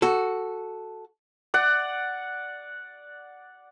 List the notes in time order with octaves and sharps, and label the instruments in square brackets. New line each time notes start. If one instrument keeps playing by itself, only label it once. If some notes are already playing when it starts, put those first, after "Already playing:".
[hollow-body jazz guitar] F#4 A4
[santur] D5 F#5